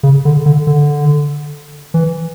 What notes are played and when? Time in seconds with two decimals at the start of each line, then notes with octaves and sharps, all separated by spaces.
0.03 C#3
0.25 D3
0.46 D3
0.67 D3
1.94 E3